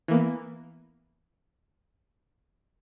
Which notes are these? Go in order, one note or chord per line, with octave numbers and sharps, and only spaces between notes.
E3 A#3 B3